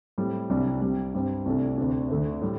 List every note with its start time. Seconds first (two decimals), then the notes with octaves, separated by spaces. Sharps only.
0.18 A2 G3 C4
0.50 C2 C3 G3 D4
0.82 C2 C3 G3
1.14 G2 G3 C4
1.46 C2 C3 A3 D4
1.78 D2 C3 A3 D4
2.10 D2 D3 A3 D4
2.42 A2 G3